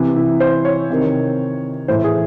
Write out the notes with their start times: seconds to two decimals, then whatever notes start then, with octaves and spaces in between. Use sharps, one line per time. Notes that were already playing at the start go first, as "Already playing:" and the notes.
Already playing: C3 E3
0.16 E4
0.40 C5
0.65 C#5
0.90 C3 D#3
1.88 A2 E3 C5
2.04 G#4